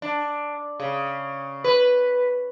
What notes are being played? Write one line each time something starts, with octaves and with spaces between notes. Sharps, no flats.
D4
C#3
B4